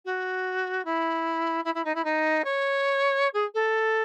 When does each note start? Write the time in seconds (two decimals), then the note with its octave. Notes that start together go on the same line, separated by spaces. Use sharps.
0.05 F#4
0.85 E4
1.64 E4
1.74 E4
1.84 D#4
1.95 E4
2.04 D#4
2.44 C#5
3.33 G#4
3.54 A4